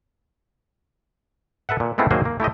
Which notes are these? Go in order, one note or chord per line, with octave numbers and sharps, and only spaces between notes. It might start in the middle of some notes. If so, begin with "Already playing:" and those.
A4 B4 E5 F#5
A#2
G#3 A3 B3 C4 E4 F4
D#3 F#3 A#3 F#4 G#4 C5
A#3
A3 E4 G4 D#5